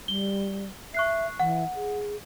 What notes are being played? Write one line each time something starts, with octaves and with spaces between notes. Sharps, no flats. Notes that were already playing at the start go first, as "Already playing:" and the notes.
G3 G7
E5 C#6 F#6 C7
E3 F#5
G#4